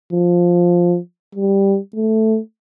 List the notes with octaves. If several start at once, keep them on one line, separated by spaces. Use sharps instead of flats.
F3
G3
A3